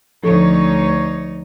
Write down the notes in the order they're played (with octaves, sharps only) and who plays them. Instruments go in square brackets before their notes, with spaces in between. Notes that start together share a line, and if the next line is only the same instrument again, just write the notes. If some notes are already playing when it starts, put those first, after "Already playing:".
[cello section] D2 D#4 C#5 [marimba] F3 A4